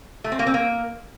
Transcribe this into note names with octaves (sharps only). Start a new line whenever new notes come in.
A3
C4
A#3
C4
A#3